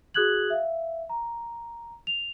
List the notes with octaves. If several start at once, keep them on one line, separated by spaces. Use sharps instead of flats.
F#4 G#4 D#6 F#6 G#6 F#7
E5 F5
A#5
F7